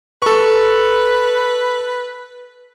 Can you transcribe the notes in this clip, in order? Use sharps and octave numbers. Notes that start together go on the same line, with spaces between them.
A4 B4 C#6